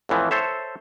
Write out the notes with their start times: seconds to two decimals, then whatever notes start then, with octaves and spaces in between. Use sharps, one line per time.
0.09 F2 A2 E3 F3
0.31 A4 C5 C#5 E5